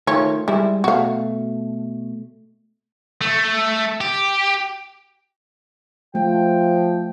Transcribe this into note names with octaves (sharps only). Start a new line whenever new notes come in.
D#3 F3 A3 C#5
G3 G#3 E4
B2 A3 F#4 F5
A3
G4
F3 A3 G5